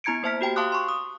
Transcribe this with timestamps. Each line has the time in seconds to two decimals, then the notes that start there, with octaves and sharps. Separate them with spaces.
0.04 B3 E4 A#5 G#6 C#7 D7
0.23 A#3 C5 E5 A5 F6 B6
0.41 F#4 G4 G5 A5
0.56 F5 A5 C6 D6 D#6 F#6
0.72 C6 C#6
0.89 D#6